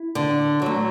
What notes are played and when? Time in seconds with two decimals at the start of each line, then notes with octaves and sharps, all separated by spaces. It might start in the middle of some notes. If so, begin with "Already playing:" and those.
Already playing: E4
0.15 D3
0.62 F#3 A3